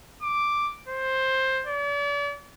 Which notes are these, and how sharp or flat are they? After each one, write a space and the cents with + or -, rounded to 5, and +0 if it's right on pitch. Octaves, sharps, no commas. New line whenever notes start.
D6 +0
C5 +10
D5 -40